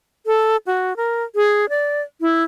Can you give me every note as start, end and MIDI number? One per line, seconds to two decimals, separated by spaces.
0.26 0.57 69
0.67 0.96 66
0.96 1.24 70
1.35 1.69 68
1.69 2.02 74
2.21 2.43 64